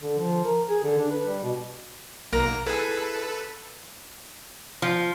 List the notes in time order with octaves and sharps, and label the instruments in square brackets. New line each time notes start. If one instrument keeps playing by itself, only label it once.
[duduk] D3
F3
A#4
G#4
D3
D4
B4
G3
B2
[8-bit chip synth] B1 A#3 A#6 [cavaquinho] A#4
[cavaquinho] E4 G#4 [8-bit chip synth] A4 B4
[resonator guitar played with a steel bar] F3